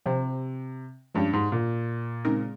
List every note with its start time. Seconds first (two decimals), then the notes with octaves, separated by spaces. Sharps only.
0.06 C3 F3 C4 G4 C5
1.15 G2 F3 G#3 C#4 G4
1.33 G#2
1.52 A#2
2.25 C#3 G#3 C4 D#4 A#4